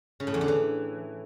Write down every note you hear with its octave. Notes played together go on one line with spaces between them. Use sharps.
C#3
A2
E2
D3
E3